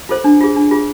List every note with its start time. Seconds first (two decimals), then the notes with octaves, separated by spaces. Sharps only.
0.09 F4 A4 C5
0.24 D4
0.40 F4 G#4
0.56 D4
0.71 F4 G#4